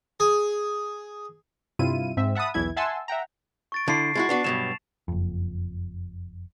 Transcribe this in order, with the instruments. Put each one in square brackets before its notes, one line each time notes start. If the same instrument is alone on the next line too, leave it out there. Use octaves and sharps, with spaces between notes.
[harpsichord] G#4
[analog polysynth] G2 C3 E4 F4 D#7
G#2 C4 E5
E5 F#5 A5 B5 D#6
B1 E2 E3 E4 G#6
E5 F#5 G#5 A5 C6 E6
E5 F#5 G5 A#5
[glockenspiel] C#6 A6 D7
[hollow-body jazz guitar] D3 E4 [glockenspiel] A5 A#6 C7
[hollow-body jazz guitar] G#3 E4 F#4 [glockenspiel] A6
[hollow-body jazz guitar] B3 D4 F#4
[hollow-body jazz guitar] G2 B2 F#3 [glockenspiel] E7 F7
[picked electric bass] F#1 F2